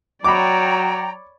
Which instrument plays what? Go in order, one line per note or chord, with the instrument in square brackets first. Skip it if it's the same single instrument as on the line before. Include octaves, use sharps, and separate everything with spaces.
[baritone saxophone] F#3 [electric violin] C#5 D5 [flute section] G5 A#5 [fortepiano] B5 D6